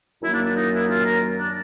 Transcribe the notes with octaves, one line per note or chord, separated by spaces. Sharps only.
F#2 D#3 F#3 A#3 E4
D4
D4
D#4
E4
F4
A#4
D4